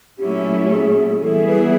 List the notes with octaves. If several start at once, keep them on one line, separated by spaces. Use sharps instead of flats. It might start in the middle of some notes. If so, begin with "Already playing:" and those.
A#2 F#3 A3 C#4 E4 G4
G#4
E3 G3 B3 E4 G#4 A4
B4